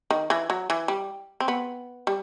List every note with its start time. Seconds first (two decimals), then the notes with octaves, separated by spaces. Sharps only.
0.11 D#3
0.30 E3
0.50 F#3
0.70 E3
0.88 G3
1.40 C4
1.48 B3
2.07 G3